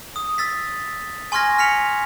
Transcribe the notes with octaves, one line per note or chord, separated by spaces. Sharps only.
D#6
E6 A6 B6
G#5 C6 C#6 F6 G#6 A#6
F6 B6 C#7 F7